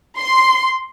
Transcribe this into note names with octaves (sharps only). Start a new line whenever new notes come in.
C6